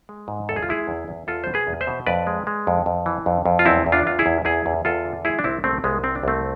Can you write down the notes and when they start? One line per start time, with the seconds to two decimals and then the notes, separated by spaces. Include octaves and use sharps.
0.09 G#3
0.28 G#2
0.49 E2 A4
0.56 G#4
0.63 F4
0.69 G#3 E4 G#4
0.88 E2
1.08 E2
1.27 E2 F4 A4
1.44 B2 C5
1.54 G#4 B4
1.67 E2
1.81 C5 E5
1.87 B2
2.07 F2 B4 D5
2.27 G#3
2.47 G#3
2.67 F2
2.86 F2
3.06 E3
3.26 F2
3.45 F2
3.59 F4
3.65 E2 C4 E4
3.86 E2
3.92 D4 F4
4.05 E2 F4
4.19 E4 G#4
4.26 E2
4.45 E2 E4 G#4
4.66 E2
4.85 E2 F4 A4
5.05 D3
5.25 G#3 E4 G#4
5.39 D4
5.44 C2 C4 E4
5.64 C2 A3 C4
5.84 C2 G#3 B3
6.04 C3 C4
6.15 D4
6.23 C2 A3 C4